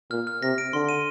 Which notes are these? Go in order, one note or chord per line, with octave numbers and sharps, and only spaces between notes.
A#2 F6
F6
C3 A#6
D7
D3 C6
D#7